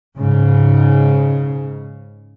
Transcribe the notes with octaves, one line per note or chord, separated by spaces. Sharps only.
G#2 C#3